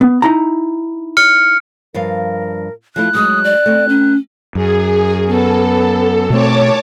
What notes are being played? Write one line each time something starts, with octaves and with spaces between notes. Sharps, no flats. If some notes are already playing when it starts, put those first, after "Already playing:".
B3
D#4 E4 A#5
F6 C#7
G2 F3 A#4 F5
F3 A3 E4 F#6
F#3 G#3 D#4 D#6
D5
A3 C4
C#4
F#2 G#4
B3 A4
B2 A3 C4 C#5 A5 D6